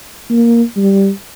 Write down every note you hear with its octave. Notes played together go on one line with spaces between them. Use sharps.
A#3
G3